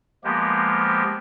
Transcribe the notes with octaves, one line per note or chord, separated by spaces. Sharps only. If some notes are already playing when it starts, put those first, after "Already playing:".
F3 G#3 A#3 B3 G4